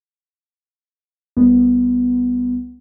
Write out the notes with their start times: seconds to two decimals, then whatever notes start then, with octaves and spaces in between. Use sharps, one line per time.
1.37 C2 B3